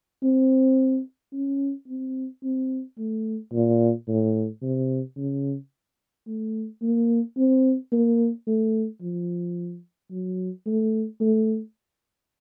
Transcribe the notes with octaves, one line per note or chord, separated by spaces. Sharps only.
C4
C#4
C4
C4
A3
A#2
A2
C3
C#3
A3
A#3
C4
A#3
A3
F3
F#3
A3
A3